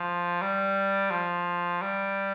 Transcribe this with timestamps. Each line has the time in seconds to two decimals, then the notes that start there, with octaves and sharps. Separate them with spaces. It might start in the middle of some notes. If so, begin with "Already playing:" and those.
Already playing: F3
0.42 G3
1.11 F3
1.82 G3